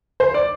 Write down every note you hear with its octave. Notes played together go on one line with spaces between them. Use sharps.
C5
D5